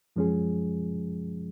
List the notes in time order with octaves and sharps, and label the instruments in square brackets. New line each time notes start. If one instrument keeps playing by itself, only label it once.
[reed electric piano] F#2 F3 G#3 C#4 G#4